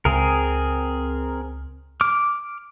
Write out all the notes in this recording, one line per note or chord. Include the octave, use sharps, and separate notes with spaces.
C#2 C4 G#4 A#4
D6 F6